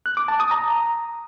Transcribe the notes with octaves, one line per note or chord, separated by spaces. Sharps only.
F#6
D6
A5
D#6
A#5